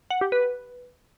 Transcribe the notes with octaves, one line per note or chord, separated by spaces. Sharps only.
F#5
G4
B4